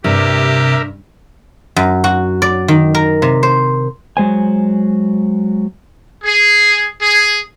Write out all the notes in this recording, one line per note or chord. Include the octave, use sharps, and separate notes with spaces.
G2 C3 G4 A#4 E5
F#2
F#4
D5
D#3
A#4
C3
C5
F#3 G#3 C5 G#5
G#4
G#4